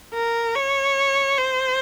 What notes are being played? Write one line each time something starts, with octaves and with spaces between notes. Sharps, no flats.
A#4
C#5
C5